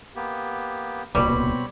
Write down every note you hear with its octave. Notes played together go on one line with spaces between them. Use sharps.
A#3 B3 G4
D1 C2 B2 G3 A#3 C4 C#5 B5